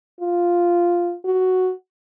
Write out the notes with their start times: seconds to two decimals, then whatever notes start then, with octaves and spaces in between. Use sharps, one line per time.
0.21 F4
1.25 F#4